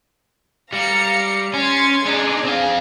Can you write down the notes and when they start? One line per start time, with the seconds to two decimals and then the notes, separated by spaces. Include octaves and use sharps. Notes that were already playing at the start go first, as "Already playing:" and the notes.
0.73 G3 F5 A#5 C#7
1.53 C#4 C6 G#6 A6
2.05 D4 D#4 G#4
2.44 C4 F5